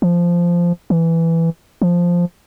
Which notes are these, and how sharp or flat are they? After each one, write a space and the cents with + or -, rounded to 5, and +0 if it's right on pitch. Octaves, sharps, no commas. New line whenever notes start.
F3 -10
E3 +5
F3 +0